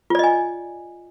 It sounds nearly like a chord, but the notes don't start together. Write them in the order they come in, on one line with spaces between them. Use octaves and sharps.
F4 D5 D#5 G#5